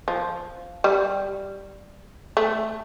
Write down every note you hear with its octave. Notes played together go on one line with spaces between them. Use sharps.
F3
G3
A3